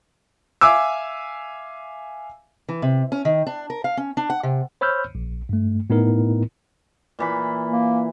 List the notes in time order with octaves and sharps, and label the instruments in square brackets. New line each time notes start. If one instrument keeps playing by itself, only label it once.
[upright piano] E5 F5 G#5 D6 E6
[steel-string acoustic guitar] E3
C3
C#4
D#3
D4
A#4
F5
C#4
D4
F#5
C3
[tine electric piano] C5 C#5 B5 E6 F6 G6
A#1
G2 A3
A2 B3 D#4 E4 A#4
[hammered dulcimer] A#2 E3 B5
[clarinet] A#3